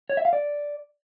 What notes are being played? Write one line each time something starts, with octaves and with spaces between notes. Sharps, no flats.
C#5
E5
F5
D5